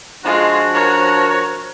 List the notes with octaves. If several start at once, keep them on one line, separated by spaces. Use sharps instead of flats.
F3 G#3 D4 F4 F#4
A#4 C#5